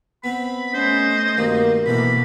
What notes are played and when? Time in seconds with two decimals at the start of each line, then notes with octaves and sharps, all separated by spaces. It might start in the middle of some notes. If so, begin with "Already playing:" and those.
0.24 B3 C4 B5
0.74 A3 C#4 C5 D#5
1.37 B1 G2 D#3 A#3
1.86 B2 D3 E3 A#3 B5